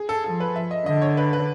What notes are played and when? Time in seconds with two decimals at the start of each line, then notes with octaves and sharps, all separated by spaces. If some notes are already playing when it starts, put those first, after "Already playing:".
Already playing: G#4
0.09 A4
0.24 F3 A4
0.40 B4
0.56 E5
0.71 D#5
0.86 D3 D#5
1.01 C#5
1.17 B4
1.33 B4